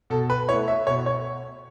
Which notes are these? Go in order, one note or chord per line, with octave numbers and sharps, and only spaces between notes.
B2 A4
B4
A3 E4 C#5
E5
B2 C#5
C#5